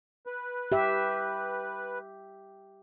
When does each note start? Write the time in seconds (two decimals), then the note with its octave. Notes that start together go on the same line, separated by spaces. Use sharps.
0.26 B4
0.72 G4 E5